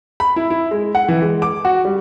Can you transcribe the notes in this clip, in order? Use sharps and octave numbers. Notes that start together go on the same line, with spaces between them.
B5
E4
E4
G#3
F#5
E3
G#3
D6
F#4
G3